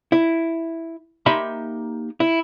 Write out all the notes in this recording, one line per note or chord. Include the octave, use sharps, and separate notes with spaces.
E4
A#3 D#4 G4 E5 B5 C6
E4